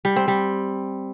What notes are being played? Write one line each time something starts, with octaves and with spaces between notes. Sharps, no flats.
G3
C4
G3